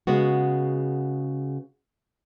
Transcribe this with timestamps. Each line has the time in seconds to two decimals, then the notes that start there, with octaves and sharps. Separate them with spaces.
0.07 C#3 G#3 B3 F#4